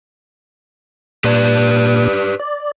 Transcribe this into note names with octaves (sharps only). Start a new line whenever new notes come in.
A#2 G4 B4 D5
D5